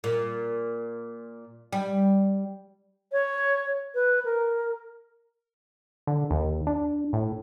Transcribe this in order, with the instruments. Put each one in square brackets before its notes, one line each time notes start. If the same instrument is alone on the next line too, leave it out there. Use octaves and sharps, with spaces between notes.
[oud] A#2
G3
[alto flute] C#5
B4
A#4
[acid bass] D3
D#2
D4
A2